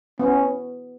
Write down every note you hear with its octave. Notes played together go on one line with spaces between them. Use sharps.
B3 C#4